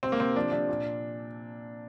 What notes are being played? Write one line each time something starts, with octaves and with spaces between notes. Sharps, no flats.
C3 C4
A#3
C3 C4
F3 D4
C3 D4
A#2